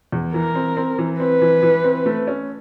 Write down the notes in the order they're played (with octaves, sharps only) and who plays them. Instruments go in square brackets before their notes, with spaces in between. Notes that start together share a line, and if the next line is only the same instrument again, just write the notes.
[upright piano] E2
[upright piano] E3 [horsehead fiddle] A#4
[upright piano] C4
C4
E3
[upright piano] C4 [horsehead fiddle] B4
[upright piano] E3
E3
C4
A3
C#4